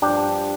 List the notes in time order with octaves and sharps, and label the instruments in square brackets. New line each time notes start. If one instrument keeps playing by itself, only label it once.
[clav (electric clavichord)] G2 F3 D4 G4